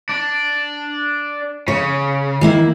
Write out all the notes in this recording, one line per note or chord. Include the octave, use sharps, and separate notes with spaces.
D4
C#3 C#5
D#3 A#3 E4